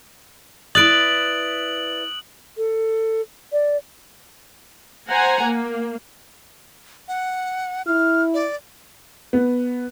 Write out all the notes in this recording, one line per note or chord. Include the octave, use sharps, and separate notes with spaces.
E4 B4 D5 D#6 F#6 A6 D7 F#7
A4
D5
C5 F#5 G#5 A#5
A#3
F#5
E4 F6
D5
B3